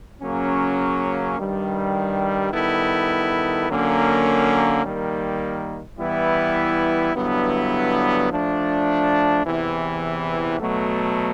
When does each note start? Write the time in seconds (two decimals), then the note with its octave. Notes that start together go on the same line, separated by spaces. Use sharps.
0.21 C#3 F#3 A#3 C#4
1.37 G2 D#3 G3
2.52 D#3 G3 B3 E4 A4
3.67 D3 F#3 A#3 C#4
4.82 D#3 G3 A#3
5.98 E3 G3 B3 E4
7.13 G2 D3 F#3 B3 E4
8.29 F3 A3 D4
9.44 E2 C3 E3
10.59 B2 F#3 A3